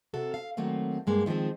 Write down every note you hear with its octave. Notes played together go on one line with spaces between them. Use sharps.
C3 F#4 A4
F5
D#3 F#3 A3 A#3 C4
G2 G#3 A#3
D#3 F3 G3 G#3 C4